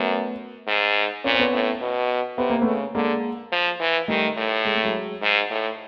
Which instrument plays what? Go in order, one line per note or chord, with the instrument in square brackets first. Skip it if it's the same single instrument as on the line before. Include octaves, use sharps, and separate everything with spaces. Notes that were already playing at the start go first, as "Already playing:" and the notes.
Already playing: [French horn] F#2 [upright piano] A3 B3
[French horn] G#2
[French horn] A#2 [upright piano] C#4
[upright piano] C4
B3 C#4
[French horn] A2
B2
[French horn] C3 [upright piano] B3
[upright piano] A#3
[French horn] C#3 [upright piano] A3 B3
[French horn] D3 [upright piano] G#3 A#3
[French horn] F3
E3
[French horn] D#3 [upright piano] G3 A3
[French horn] A2
[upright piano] G#3
A3
F#3 G#3
[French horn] G#2
A2